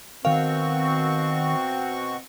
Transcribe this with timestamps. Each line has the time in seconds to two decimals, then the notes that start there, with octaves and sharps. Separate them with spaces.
0.25 B2 D#3 C4 F#4 A#4 F5 C#6